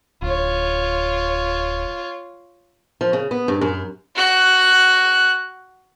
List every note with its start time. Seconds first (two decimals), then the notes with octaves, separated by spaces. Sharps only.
0.22 D1 F4 C#5
3.01 F3
3.13 C#3
3.31 B3
3.48 G2
3.61 F#2
4.15 F#4 F#6